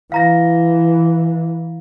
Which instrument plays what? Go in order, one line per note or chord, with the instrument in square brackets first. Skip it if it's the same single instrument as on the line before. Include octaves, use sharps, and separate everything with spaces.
[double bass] E3 [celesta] F5 A#5 A#6